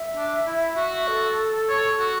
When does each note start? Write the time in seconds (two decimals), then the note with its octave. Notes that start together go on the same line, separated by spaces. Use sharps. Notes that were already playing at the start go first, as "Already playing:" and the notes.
Already playing: E5
0.16 D4
0.47 E4
0.77 F#4
1.08 A4
1.69 C#5
1.99 F#4